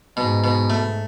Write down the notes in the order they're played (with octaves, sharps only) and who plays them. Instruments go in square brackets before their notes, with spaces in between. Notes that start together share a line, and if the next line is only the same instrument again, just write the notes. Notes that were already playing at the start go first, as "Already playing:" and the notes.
[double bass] G#2 [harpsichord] B2
[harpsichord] B2
A3